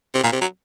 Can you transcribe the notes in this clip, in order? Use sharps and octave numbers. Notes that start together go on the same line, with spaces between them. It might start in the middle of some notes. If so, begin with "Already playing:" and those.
C3
A#2
C3
F#3